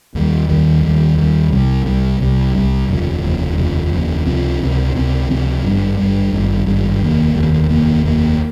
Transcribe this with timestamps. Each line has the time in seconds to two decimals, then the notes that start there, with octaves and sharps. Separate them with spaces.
0.15 D#2 D#3 G3
0.49 D#2 D#3 G3
0.83 D#2 D#3 G3
1.17 D#2 D#3 G3
1.52 C2 C3 G3
1.86 C2 C3 G3
2.20 C2 C3 G3
2.55 C2 C3 G3
2.89 F1 D#2 C#3 F3
3.23 F1 D#2 C#3 F3
3.57 F1 D#2 C#3 F3
3.92 F1 D#2 C#3 F3
4.26 C#2 C3 F3 C4
4.60 C#2 C3 F3 C4
4.95 C#2 C3 F3 C4
5.28 C#2 C3 F3 C4
5.63 G#1 G2 G3
5.97 G#1 G2 G3
6.32 G#1 G2 G3
6.66 G#1 G2 G3
7.00 F1 D#2 D#3 A#3
7.34 F1 D#2 D#3 A#3
7.69 F1 D#2 D#3 A#3
8.03 F1 D#2 D#3 A#3